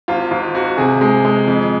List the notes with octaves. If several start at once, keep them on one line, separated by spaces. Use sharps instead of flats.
G#1 F4
G#2 F4
G#1 F#4
C3 G#4
G#3
G#3
F2